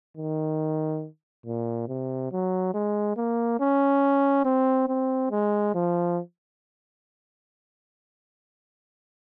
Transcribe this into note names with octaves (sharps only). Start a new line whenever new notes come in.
D#3
A#2
C3
F#3
G#3
A#3
C#4
C4
C4
G#3
F3